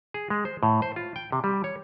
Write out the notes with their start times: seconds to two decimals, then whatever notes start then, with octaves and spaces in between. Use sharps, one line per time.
0.14 G#4
0.30 G#3
0.45 C5
0.63 A2
0.82 C5
0.96 F4
1.16 G5
1.32 C3
1.44 G3
1.64 C#5